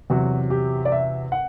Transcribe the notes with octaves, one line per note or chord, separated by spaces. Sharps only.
E2 C3 F#3 F#4
G4
D5
E5
F#5